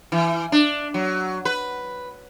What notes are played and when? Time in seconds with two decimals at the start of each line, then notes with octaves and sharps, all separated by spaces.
0.12 E3
0.52 D4
0.94 F#3
1.45 B4